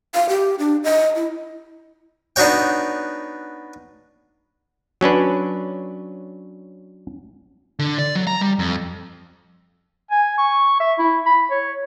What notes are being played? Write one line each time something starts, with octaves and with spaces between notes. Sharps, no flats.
F5
G4
D4
D#5
E4
B3 D4 D#4 F#4 C#5 G5
F#3 C#4 D4 B4
D3
D5
F#3
A#5
G3
F2
G#5
C#6
E5
E4
B5
C#5